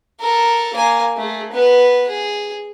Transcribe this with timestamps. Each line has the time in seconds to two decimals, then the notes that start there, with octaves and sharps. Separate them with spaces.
0.20 A4 A#4
0.74 A#3 G#5
1.17 A3 G#4
1.52 B3 B4
2.08 G#4